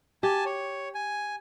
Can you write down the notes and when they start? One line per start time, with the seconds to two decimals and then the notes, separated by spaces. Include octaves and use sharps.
0.23 G4 G#5 A5
0.46 C#5
0.95 G#5